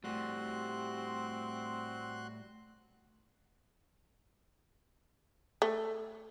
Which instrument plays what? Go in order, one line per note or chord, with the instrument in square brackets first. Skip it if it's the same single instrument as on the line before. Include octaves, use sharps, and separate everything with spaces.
[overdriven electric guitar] A2 [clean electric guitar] G3 A3 G4 [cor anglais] C4 [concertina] F#4 C6 F#6
[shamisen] A3